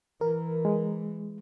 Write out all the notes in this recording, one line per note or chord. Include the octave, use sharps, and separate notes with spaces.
E3 A#4
G#3